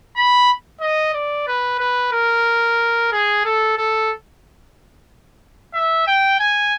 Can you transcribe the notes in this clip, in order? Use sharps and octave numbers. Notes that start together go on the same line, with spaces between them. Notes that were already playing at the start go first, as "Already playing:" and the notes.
B5
D#5
D5
B4
B4
A#4
G#4
A4
A4
E5
G5
G#5